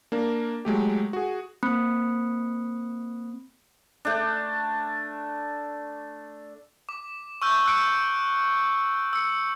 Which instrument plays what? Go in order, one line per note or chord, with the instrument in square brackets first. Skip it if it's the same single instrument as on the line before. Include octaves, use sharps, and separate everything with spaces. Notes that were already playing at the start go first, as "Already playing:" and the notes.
[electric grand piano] A#3 D4 A#4
F#3 G#3 A3 G4
F#4 G#4
[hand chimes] A#3 C4 B5 D#6 F#6 C#7
[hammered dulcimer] A3 D4
[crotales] D6
C#6 E6 F6 G6
E6 F#6 C#7 D7
E6 C#7